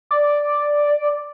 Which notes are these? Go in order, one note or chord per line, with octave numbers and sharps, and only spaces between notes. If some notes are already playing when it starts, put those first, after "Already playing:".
D5